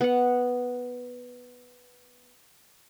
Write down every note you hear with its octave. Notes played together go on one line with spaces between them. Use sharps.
B3 F#5